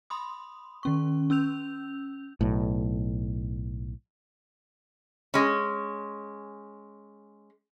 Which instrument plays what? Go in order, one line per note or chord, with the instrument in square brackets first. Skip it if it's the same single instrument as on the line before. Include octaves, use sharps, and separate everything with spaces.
[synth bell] B5 C6 D#6
D#3 C#4 C#6
C#4 E6 G6 F7
[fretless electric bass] B1 A2
[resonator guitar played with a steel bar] G#3 C#4